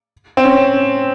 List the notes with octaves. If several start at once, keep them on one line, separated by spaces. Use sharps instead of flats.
C4
C#4